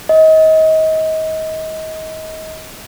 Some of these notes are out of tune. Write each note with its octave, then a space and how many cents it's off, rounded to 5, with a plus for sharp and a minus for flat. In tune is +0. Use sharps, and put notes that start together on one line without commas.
D#5 +30